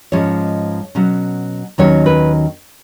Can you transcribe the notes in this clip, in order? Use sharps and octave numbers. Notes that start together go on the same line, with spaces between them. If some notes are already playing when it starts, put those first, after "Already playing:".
G#2 F3 G#3 C#4 C#5
B2 F#3 C#4
D#2 D#3 F#3 C#4 C#5
B4